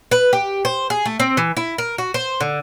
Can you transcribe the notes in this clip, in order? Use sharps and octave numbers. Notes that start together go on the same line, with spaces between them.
B4
G4
C5
G#4
A3
C4
E3
E4
A#4
F#4
C5
D3